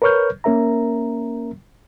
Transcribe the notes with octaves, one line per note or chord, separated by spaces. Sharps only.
A#4 B4 C#5 C#6 F6 G6
A#3 C#4 A#4 E5 A#5